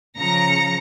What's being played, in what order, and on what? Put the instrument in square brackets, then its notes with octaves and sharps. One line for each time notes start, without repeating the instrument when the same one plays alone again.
[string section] C#3 F3 A#5 A#6 C#7